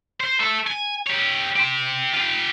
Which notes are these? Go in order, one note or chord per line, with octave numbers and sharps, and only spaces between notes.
C5
A4 E5
G#5
G4 C#5
G4 C5
F4 G4